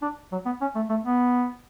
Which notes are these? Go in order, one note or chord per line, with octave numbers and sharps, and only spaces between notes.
D4
F#3
B3
C#4
A3
A3
B3